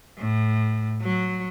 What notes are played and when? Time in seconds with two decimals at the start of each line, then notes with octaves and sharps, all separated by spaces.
0.18 A2
1.02 F#3